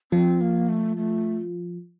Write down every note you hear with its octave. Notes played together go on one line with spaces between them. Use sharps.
F3 C4 F4
A#3
A3
A3